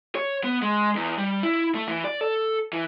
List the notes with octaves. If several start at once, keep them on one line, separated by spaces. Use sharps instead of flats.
C#5
B3
G#3
E2
G3
E4
A3
E3
D5
A4
E3